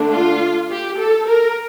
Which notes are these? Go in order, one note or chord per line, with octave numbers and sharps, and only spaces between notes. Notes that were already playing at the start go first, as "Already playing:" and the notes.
Already playing: D3 A3 D4
F4
G4
A4
A#4